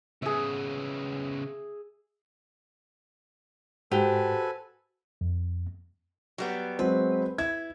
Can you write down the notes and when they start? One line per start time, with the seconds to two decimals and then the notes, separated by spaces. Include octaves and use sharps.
0.22 C#3 B3 G#4 E5
3.92 G#2 F#4 G4 A4 B4 C5 F#5 G#5
5.21 F2
6.38 F#3 G3 B3
6.79 F#3 G#3 C4 B4
7.38 E4 G#6